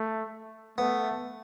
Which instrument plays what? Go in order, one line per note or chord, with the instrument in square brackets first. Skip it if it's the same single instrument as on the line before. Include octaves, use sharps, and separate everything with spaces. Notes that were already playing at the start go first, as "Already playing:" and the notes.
Already playing: [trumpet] A3
[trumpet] A3 [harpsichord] B3